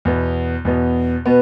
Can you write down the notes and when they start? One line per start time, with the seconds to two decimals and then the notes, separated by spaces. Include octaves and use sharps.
0.05 E2 B2 B3
0.65 E2 B2 B3
1.26 B2 B3 B4